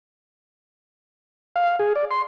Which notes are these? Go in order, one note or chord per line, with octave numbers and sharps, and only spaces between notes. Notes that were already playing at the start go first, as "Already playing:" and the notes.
F5
G#4
D5
C6